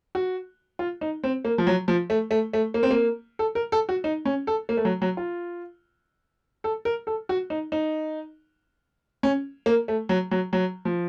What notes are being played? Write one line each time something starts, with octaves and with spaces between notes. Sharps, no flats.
F#4
F4
D#4
C4
A#3
F3
F#3
F3
A3
A3
A3
A#3
C4
A#3
A4
A#4
A4
F#4
D#4
C#4
A4
A#3
A3
F#3
F#3
F4
A4
A#4
A4
F#4
D#4
D#4
C#4
A#3
A3
F#3
F#3
F#3
F3